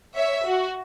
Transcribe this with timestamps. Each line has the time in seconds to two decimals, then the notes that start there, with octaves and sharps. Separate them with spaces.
0.16 C#5 E5
0.45 F#4